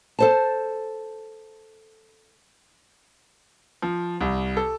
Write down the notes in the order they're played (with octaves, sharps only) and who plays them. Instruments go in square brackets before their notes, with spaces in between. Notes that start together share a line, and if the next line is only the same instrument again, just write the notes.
[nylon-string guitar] A4 C5 A5
[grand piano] F3
C2
A4